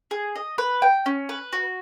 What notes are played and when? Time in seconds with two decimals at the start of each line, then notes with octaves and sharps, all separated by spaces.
0.11 G#4
0.36 D#5
0.58 B4
0.82 G5
1.06 C#4
1.29 B4
1.53 F#4